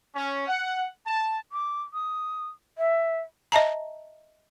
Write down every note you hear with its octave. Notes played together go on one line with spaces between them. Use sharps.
C#4
F#5
A5
D6
D#6
E5
D#5 E5 A5 A#5